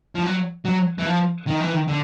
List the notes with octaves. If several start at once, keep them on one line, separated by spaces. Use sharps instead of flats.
F3
F#3
F#3
E3
F3
D#3
E3
D#3
D3